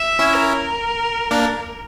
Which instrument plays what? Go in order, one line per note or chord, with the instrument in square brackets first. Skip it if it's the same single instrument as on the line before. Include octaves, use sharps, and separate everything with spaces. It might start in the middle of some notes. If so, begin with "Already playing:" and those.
Already playing: [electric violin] E5
[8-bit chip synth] C#4 E4
[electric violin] A#4
[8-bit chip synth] A#3 D4